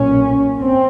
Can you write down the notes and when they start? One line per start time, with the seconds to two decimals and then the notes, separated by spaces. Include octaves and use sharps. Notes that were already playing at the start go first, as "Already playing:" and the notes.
Already playing: B1 A#2 C#4
0.59 C4